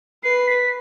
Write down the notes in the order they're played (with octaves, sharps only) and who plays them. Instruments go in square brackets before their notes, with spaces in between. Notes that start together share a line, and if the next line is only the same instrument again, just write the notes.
[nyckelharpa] B4 [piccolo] C7
[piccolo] B6